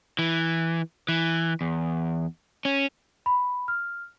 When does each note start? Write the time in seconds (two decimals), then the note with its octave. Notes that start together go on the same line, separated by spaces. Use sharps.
0.19 E3
1.09 E3
1.61 E2
2.65 C#4
3.26 B5
3.68 F6